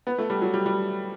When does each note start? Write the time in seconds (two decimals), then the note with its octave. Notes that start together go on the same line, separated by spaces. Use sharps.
0.07 B3
0.18 A3
0.30 G3
0.42 F#3
0.54 G3
0.66 G3